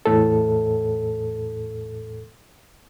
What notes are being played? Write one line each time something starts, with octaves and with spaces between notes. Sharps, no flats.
E2 A2 A4